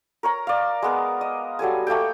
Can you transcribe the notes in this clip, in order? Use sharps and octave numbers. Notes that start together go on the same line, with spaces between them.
A#4 C#5 A#5
D5 F5
G#3 B3 A#4
D#5
F#3 G3 A4 G#5
A3 A#3 A4 G5